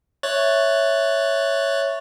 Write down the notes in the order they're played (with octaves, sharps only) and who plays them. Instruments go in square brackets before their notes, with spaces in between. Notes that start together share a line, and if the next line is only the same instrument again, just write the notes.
[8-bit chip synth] C#5 F#6 A6 [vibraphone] E5